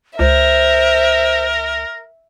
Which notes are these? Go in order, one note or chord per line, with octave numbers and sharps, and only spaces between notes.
C#2 A#4 C5 E5